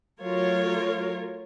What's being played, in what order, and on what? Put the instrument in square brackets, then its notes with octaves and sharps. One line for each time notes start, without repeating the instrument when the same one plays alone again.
[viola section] F#3 A3 F4 A#4 C#5